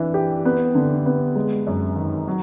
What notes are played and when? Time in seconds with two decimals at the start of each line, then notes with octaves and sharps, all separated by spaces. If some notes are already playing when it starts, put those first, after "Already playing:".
Already playing: E3 D4
0.14 G4
0.45 B3
0.75 D3
1.06 B3
1.35 G#3
1.67 F#2
1.96 D#3
2.27 F#3